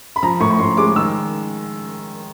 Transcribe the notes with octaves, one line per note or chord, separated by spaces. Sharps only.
B5
F3 A#5
A2 C#6
C#6
A2 C6
G#3 D6
D#3 E6